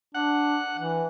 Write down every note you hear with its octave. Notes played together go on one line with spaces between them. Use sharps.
D4 F#5
E3